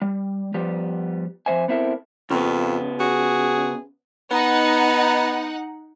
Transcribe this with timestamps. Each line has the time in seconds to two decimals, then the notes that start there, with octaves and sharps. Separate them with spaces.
0.02 G3
0.54 F3 G3 B3 G4
1.46 F2 A#3 C5 E5 G#5
1.68 B3 C4 E4 A4 A#4
2.30 F2 C#3 B3
3.00 F#4 G#4
4.31 B3 D#4 F#5